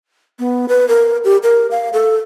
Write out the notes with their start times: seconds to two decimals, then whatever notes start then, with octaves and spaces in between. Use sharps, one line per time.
0.39 B3
0.69 B4
0.88 A#4
1.24 G4
1.43 A#4
1.71 F5
1.93 A4